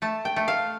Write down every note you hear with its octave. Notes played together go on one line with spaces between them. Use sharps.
A3 A5
G5
A3
F5